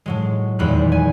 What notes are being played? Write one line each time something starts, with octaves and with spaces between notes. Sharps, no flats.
A2 F#3 G#3
D#1 E2 G#3 B5 F#6
G#5